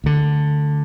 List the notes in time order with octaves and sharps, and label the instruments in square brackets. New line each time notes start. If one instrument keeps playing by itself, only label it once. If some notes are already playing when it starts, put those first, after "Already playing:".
[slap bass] D2 D3